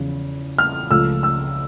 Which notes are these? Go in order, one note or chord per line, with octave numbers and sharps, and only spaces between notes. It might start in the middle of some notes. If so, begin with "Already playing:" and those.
Already playing: E2 C#3 F3
F6
C#2 C#3 F3 A3 E6
E6